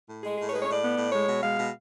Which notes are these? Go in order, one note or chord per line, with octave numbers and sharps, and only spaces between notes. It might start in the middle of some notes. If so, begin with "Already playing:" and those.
A2
G#3 G#4
A2 G#4
C#5
G#3 B4
C#5
A2 D5
B3
A2
G#3 C#5
B2
G#3 F5
B2